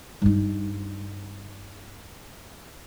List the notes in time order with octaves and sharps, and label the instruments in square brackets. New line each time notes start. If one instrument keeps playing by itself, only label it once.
[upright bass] G2 D#4